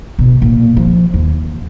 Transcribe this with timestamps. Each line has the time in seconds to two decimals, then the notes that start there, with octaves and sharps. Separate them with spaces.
0.19 B2
0.42 A#2
0.77 F3
1.14 D#2